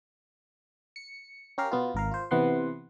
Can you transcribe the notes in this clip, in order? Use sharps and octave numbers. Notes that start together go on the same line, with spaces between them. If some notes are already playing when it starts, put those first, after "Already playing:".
C#7
C#4 G4 A#4 F5
B2 B3 F4
G#1 A#4 F5
F4 C5
C3 E3 B3 F#5 C6